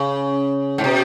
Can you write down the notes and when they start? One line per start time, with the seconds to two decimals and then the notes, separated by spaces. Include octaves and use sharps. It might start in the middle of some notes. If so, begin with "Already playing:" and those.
Already playing: C#3
0.78 G#2
0.84 B2